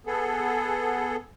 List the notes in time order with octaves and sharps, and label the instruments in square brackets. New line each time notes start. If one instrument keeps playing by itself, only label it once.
[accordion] B3 G#4 A4